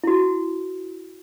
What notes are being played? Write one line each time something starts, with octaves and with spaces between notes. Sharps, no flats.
E4 F#4